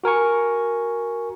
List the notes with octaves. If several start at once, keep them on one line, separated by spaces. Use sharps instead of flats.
F#4 A#4 G#5 C#6